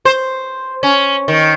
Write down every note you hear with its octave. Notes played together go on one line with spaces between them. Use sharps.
C5
C#4
D#3